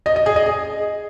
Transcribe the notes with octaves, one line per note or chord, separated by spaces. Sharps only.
D#5
D#5
G#4
D#5
G#4